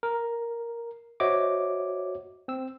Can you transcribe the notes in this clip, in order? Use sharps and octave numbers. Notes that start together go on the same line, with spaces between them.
A#4
F#4 C5 C#5 D#5 E5 D6
C4 E6